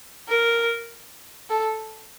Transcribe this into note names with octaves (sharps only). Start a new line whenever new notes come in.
A#4
A4